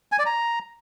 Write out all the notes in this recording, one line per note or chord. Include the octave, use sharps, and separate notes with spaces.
G#5
D5
A#5